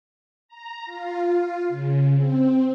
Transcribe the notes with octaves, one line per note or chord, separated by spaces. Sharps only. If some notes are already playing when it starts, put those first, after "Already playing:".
A#5
F4
C#3
C4